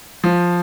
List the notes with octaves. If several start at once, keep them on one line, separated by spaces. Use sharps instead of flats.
F3